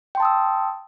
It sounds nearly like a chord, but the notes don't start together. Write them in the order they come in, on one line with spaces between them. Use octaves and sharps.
G5 C6 A5 D#6 E6